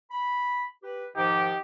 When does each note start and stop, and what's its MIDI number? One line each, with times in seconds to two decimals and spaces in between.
0.11 0.64 83
0.83 1.06 67
0.83 1.06 71
1.16 1.52 44
1.16 1.52 51
1.16 1.52 53
1.16 1.60 63
1.16 1.60 67